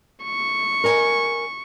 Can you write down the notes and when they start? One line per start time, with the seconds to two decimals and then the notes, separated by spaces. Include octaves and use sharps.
0.24 C#6
0.84 A#4 D#5 G#5